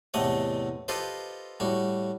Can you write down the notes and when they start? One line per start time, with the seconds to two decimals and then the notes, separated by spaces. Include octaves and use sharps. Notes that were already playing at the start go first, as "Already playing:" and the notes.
0.14 E2 A2 C3 A3 D#5 F#5
0.88 F4 G4 A4 B4 C5 D#5
1.60 A2 G3 F#4